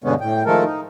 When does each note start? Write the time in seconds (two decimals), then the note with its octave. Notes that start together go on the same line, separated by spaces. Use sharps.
0.04 G2 B2 D3 G#3 B3 C#4
0.21 A2 G5
0.46 D#3 F3 G#3 A3 A4 A#4
0.64 D#4